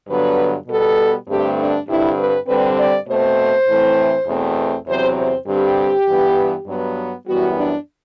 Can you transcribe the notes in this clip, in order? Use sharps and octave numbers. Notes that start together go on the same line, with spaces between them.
G2 D3 F#3 B3 B4
B2 G3 B3 A4
G2 D3 A3 C4 G4
D4
G2 D3 G3 C4 E4
B4
G2 D3 G3 C4 B4
D5
B2 A3 C4 C5
A2 E3 A3 C4
E2 B2 A3 C4
E2 C3 F#3 C4 C5
C5
G2 D3 G3 C4 G4
G2 E3 B3
G2 F#3 B3
F#2 E3 G3 B3 F#4
D4